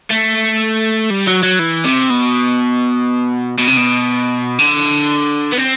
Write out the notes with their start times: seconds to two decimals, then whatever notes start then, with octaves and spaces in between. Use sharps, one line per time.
0.10 A3
1.10 G3
1.27 F#3
1.43 F#3
1.59 E3
1.84 C3
2.10 B2
3.58 B2
3.67 C3
3.77 B2
4.59 D3
5.53 B3
5.58 C4